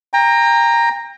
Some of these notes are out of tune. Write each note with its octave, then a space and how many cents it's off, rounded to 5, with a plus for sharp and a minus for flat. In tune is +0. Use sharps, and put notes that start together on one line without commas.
G5 +30 A#5 +0